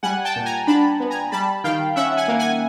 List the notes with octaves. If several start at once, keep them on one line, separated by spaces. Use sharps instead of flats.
G3 F#5 G#5
G5 A5
A#2
G#5 A#5
D4 A5 B5
B3
G#5 A#5
G3 A5 B5
D#3 F5 G5
C#4 E5 F#5
F#5 G#5
A#3
F#5 G#5